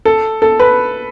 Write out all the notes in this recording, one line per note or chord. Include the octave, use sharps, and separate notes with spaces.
A4
A4
B4